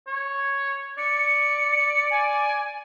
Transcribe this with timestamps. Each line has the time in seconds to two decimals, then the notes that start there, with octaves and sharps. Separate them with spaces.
0.07 C#5
0.98 D5 C#7
2.11 G#5